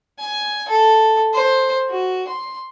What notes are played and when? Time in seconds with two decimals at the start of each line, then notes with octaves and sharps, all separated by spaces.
0.19 G#5
0.69 A4
1.34 C5
1.90 F#4
2.28 C6